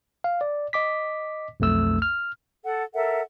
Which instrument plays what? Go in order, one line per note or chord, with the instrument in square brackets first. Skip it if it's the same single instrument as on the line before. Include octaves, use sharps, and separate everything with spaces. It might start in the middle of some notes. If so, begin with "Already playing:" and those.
[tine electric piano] F5
D5
D#5 D6 B6
B1 F2 A3 E6
F6
[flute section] A4 F#5
A4 A#4 E5 F#5